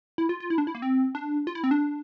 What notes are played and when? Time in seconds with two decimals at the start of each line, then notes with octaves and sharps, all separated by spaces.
0.18 E4
0.29 F4
0.40 F4
0.50 E4
0.58 D4
0.67 E4
0.75 A#3
0.82 C4
1.15 D4
1.47 F4
1.55 E4
1.64 C4
1.71 D4